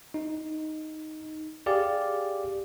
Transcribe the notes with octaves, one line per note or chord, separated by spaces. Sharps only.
D#4
G4 G#4 D5 F5